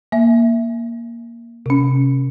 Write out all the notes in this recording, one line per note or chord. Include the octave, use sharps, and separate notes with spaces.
A#3 E5
C3 C#4